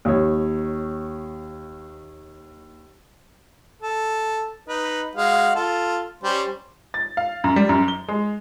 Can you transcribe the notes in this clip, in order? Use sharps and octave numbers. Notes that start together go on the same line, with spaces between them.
D#2 C#5
A4
D#4 B4
G#3 F#4 F5
F4 A4
G3 C#4 C5
A6
F5
F#2
G3
F#2
G7
G#3